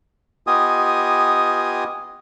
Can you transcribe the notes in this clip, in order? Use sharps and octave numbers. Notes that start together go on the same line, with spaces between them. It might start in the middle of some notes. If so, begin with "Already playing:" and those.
B3 F4 G4 D#5 G#5 D#6